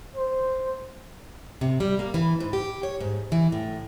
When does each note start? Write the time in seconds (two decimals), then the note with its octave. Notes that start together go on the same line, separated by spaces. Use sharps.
0.16 C5
1.61 C3
1.80 G3
1.99 A#3
2.14 E3
2.40 G#2
2.53 G4
2.83 C#5
3.00 G#2
3.32 E3
3.52 A2